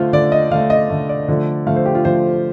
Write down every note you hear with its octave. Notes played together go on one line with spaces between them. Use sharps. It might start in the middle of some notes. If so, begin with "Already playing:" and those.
Already playing: D3 A3 F4 C5
D3 A3 D5
D#5
D3 A3 F5
D#5
D3 A3
D5
D3 F3 A3
D3 F3 A3 F5
C5
G4
F4
D3 F3 A3 C5